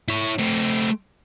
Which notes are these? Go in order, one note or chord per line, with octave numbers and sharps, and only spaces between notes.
E4 C#5
A3 C4